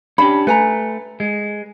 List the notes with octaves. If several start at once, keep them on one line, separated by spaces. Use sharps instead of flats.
C#4 D4 G4 B5
A3 B4 G#5 A#5
G#3